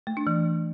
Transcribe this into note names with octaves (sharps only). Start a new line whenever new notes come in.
A3
D4
E3